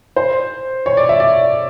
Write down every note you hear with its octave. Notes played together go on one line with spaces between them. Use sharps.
C5
C#5
D5
E5
D5